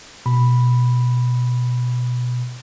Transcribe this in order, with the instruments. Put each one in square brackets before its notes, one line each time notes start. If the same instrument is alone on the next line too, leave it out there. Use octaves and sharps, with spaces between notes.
[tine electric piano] B2 B5